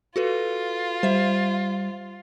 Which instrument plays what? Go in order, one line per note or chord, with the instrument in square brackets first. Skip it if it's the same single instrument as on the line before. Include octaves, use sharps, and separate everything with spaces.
[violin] F4 [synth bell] F#4 A4 B4
[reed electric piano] G3 [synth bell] C5 E5